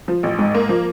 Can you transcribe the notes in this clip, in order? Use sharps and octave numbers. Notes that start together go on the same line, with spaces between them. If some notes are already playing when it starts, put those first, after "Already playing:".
F3
A1
G#2
A#3
F3